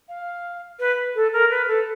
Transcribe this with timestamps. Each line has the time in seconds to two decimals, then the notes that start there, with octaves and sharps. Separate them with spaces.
0.09 F5
0.79 B4
1.15 A4
1.33 A#4
1.50 B4
1.67 A4